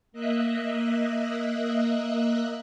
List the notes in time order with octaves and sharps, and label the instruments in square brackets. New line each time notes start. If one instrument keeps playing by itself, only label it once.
[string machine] A#3 D#5 E5 F#6